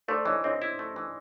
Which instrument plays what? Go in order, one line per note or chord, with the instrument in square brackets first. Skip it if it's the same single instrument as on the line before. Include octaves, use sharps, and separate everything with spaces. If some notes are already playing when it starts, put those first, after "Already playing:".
[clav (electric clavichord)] A3 [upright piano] C5 D5
[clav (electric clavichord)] E3 [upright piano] C#5 D#5
[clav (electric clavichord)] C4 [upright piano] C#5 D#5
[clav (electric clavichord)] E4
A3
E3